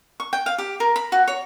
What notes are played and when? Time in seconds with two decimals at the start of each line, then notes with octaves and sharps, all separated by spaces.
0.20 C#6
0.33 G5
0.46 F5
0.58 G4
0.80 A#4
0.96 B5
1.12 F#4
1.27 C#5